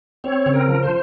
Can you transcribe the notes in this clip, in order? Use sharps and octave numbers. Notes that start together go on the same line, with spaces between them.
C4 C#5
C#3
A#4
F3
C5